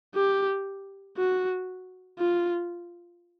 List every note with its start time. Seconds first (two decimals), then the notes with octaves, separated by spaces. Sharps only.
0.15 G4
1.18 F#4
2.19 F4